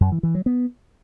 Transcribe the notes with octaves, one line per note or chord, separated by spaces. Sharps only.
F#2
E3
E3
F#3
B3